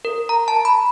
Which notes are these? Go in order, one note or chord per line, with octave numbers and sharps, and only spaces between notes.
A#4
A#5
A5
B5